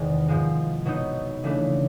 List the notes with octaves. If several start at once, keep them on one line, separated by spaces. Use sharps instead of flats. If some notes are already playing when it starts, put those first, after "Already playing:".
Already playing: E2 C3 D#3 G#3
G#2 F3 G#3
B2 F#3 B3 D#4
C#3 E3 A3 D4